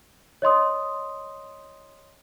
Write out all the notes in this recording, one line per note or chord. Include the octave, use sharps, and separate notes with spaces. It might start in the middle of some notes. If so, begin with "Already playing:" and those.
C#5 D#5 C6 D#6